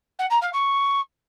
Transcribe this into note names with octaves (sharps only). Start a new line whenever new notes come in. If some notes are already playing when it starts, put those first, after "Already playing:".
F#5
A#5
F5
C#6